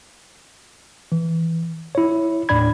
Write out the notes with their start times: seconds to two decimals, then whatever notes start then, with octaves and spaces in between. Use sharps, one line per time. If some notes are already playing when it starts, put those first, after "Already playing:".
1.12 E3
1.95 E4 C#5
2.49 D#2 A2 D4 D5 B5 G#6